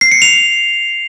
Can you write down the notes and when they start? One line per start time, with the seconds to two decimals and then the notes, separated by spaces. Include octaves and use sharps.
0.01 C7
0.12 C#7
0.22 F7